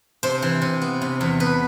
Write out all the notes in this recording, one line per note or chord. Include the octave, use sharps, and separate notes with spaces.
C3 C5
E3
C3
B3
C3
E2
B3 B4